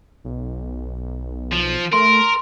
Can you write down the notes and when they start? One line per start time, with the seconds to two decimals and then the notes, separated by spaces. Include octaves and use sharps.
0.25 B1
1.53 F3
1.93 A3 A#4 C6